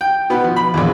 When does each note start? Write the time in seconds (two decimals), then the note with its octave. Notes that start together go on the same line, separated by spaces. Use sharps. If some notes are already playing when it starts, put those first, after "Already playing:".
0.01 G5
0.30 B2 B3
0.44 F3
0.56 B5
0.74 A#1 E2